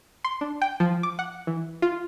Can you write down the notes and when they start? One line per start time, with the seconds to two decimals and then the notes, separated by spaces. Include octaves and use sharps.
0.24 C6
0.41 D4
0.62 G5
0.80 F3
1.03 D6
1.19 F#5
1.47 E3
1.82 F4